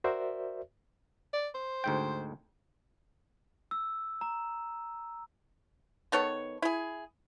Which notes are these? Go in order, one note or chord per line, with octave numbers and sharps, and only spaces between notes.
F#4 A#4 C5 D5 E5
D5
C5
D2 G#2 G5
E6
A#5
D#3 B3 A4 C#5
E4 G#4